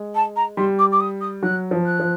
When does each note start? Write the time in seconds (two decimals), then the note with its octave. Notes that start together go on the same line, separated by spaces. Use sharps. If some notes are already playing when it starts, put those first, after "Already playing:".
Already playing: G#3
0.15 A5
0.36 A#5
0.57 G3 C6
0.79 D6
0.92 D6
1.00 D#6
1.21 D#6
1.43 F#3 F#6
1.71 F3
1.85 F#6
2.00 F3